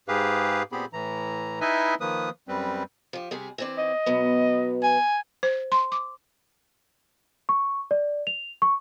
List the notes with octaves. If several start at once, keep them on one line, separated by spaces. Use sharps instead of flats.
G#2 G4 G#4 B4 F5
A#2 B3 C4 G4 G#4 B5
A2 E3 A#5
D#4 E4 B4 D#5 E5 G#5
D#3 F3 A#3 B4 D#6
F#2 G3 C4 B4
F3 G4
C3 G3 G#4
E3 C4 D5
D#5
B2 F#3 B3
G#5
C5
C6
D6
C#6
D5
F7
C#6